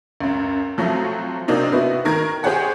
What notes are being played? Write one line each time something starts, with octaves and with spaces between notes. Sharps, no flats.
C#2 F#2
F3 F#3 A3 C4 F#4
C3 A#3 C4 D4 D#4 F#4
B3 E4 F#4
D#3 A#4 G#6
G4 G#4 C5 C#5 F#5 G5